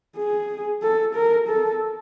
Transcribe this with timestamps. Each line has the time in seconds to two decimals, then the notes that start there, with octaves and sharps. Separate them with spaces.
0.17 G#4
0.82 A4
1.15 A#4
1.48 A4